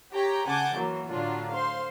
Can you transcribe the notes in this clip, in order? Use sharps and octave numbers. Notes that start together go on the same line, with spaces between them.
G4 C#5 G5 A#5
C#3 F#5 G#5 A5 D6 G6
E3 F#3 A#3
A2 D3 F#3 D4 F4
C5 F5 C6